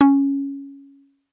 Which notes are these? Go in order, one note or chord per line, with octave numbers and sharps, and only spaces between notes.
C#4